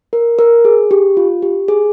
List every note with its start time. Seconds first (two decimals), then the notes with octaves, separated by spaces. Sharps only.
0.13 A#4
0.39 A#4
0.65 G#4
0.91 G4
1.17 F4
1.42 G4
1.68 G#4